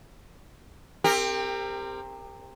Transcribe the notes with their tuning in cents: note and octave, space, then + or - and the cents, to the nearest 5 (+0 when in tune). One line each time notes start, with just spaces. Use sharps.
C4 +5 G4 +25 A#4 -20